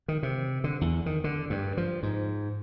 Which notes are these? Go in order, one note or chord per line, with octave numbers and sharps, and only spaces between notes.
D#3
C3
D3
E2
D#3
D3
G2
F3
G#2